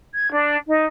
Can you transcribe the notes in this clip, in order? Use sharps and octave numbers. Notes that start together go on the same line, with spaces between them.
G#6
D4
D#4